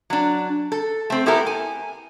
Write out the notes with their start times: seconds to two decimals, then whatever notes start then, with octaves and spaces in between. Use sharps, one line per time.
0.10 F#3 D4
0.72 A4
1.10 A3 C4
1.26 B3 E4 G4 A4 A#4
1.46 G#5